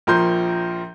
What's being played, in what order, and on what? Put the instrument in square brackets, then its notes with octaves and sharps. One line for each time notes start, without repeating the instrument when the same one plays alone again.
[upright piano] A#1 F3 A#4 C6 G6